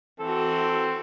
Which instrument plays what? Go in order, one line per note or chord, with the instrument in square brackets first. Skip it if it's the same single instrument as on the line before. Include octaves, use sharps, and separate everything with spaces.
[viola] E3 F#4 [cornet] C4 [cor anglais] A4